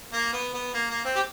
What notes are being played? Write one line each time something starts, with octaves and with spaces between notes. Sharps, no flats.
A#3
B3
B3
A#3
A#3
C4
G4